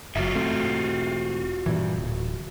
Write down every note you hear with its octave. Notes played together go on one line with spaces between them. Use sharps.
F#1 F#3 F4 F#4 E5
E1 A3 C4
G2 A#2 E3
D1